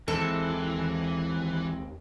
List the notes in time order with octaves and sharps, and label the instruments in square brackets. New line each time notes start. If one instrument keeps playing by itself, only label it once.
[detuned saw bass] D#2 [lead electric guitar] E3 [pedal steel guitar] G#3 C4 E4 [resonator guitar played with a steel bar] A4